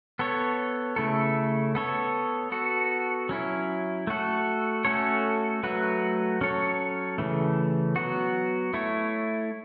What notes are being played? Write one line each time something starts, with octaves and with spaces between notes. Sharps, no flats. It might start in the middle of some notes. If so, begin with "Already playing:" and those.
B3 A4 C#5
C#3 A3 E4 A4
B3 A4 C#5
B3 F#4 A4
F#3 C#4 E4
A3 F#4 A4
A3 C#4 F#4 A4 C#5
F#3 A3 F#4 B4
F#3 C#4 A4 C#5
C#3 E3 A3
F#3 B3 F#4
A3 E4 C#5